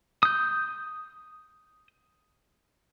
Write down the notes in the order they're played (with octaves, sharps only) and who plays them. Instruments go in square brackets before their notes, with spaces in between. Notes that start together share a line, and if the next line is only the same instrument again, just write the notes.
[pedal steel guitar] D#6 G6